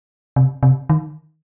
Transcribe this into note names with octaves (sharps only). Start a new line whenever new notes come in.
C3
C3
D#3